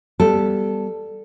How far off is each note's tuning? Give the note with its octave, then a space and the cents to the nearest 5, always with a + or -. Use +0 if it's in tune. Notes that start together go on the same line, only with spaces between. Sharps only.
G3 +0 B3 -25 A4 +0